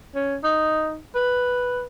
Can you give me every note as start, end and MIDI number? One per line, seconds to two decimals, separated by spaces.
0.15 0.37 61
0.44 0.99 63
1.15 1.84 71